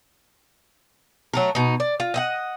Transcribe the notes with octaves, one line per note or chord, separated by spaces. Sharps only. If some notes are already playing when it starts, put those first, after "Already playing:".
F#3 A3 A#4
B2 D#4
D5
F4
D#5 E5 F#5